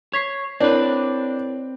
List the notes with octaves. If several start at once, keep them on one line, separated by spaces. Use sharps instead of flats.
C#5 G#6 B6 C7
C4 D4 E4 A#4 B4 C#5